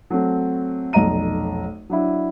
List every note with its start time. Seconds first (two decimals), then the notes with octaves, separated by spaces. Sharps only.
0.10 F#3 A3 C4
0.93 F1 B1 D#5 A#5 D#7
1.90 F#3 D4 E4